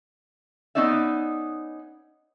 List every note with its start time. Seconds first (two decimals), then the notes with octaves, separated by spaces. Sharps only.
0.75 B3 C#4 D#4 D5 E5